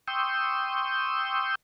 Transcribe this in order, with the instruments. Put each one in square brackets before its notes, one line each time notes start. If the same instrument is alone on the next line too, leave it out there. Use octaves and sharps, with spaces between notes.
[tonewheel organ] G5 C6 C#6 D#6 E6 G6